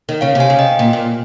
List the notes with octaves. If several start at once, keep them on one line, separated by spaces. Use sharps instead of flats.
D#3
C#3 C#5 F5
C3
F5 G#5
C#3
D#5 G5
A#2
A#2